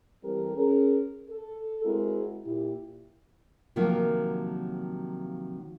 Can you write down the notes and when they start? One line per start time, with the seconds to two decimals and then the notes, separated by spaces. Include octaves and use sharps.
0.23 E3 G3 C4 G4 A4 A#4
0.56 C#4 G#4 A#4
1.29 A4
1.84 G#3 C4 E4 F#4 G#4 A#4
2.44 A#2 E4 G4
3.76 C3 D#3 F3 F#3 A#3